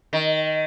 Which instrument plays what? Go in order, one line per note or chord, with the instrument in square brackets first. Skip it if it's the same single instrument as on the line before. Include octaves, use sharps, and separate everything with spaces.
[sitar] D#3